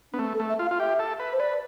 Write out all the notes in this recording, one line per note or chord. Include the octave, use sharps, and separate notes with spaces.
B3 D4
A3 C4
A4
A3
E5
F4
F5
F4
G4 E5
A4
B4
C5
B4 D5